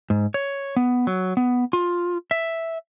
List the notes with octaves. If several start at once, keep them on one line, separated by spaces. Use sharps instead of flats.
G#2
C#5
B3
F#3
B3
F4
E5